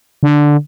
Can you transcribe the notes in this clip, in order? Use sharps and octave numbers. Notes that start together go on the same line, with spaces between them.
D3